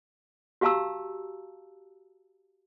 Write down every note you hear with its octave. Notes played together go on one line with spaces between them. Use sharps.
F#4 G4 F5 A5 A#5 E6